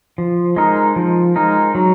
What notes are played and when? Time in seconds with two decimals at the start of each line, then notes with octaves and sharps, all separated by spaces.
0.18 F3
0.56 G#3 D#4 A#4
0.96 F3
1.36 G#3 D#4 A#4
1.75 F#3